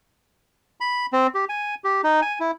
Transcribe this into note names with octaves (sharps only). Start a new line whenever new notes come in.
B5
C4
G4
G#5
G4
D#4
G#5
E4